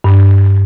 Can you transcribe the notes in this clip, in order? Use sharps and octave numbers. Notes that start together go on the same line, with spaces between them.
G2